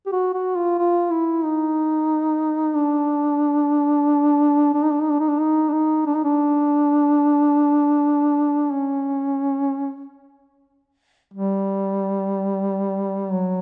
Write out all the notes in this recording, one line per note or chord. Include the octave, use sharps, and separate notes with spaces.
G4
F#4
F#4
F4
F4
E4
D#4
D4
D4
D#4
D4
D#4
D4
D#4
D4
D#4
D4
D#4
D4
D#4
D4
C#4
G3
F#3